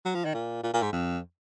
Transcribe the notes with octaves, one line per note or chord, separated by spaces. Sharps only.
F#3
F3
D#3
A#2
A#2
A#2
G#2
F2